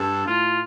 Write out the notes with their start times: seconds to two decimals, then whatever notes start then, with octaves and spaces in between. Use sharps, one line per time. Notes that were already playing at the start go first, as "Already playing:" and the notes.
Already playing: G2 A4
0.26 A2 F4